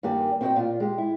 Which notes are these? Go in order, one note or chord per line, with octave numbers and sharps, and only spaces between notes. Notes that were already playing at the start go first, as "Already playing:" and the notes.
G2 D#3 A#3 G4 D5 G#5
C4 E4 F#4 C5 D#5 G5
A#2 F4
G#3 G4
E4